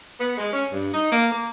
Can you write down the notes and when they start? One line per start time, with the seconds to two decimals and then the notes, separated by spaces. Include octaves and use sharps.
0.20 B3
0.37 G#3
0.52 C#4
0.72 G2
0.93 D#4
1.11 A#3
1.32 A#3